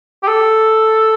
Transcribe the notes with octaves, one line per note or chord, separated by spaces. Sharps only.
G4
A4